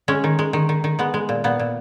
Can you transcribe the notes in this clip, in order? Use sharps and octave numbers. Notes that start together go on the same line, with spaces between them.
G#3 C#4
D#3
G#3
D#3
D#3
D#3
G#3 B3
G#3
A#2
A#2 B3
A#2